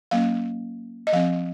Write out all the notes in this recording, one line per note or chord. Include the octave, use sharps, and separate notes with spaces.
F#3 A#3 C#4 F5
D#5
F3 C4 F5